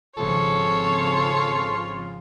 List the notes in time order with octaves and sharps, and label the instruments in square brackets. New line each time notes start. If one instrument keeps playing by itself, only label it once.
[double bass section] G#1 C#3 F3 [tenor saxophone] F4 [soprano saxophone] A4 [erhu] C#5